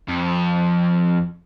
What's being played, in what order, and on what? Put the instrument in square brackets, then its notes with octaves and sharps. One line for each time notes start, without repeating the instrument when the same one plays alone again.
[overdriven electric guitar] F2